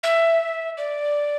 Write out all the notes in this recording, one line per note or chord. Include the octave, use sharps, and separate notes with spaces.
E5
D5